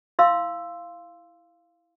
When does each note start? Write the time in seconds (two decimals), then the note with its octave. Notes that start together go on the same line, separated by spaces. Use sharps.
0.19 E4 F5 C6 E6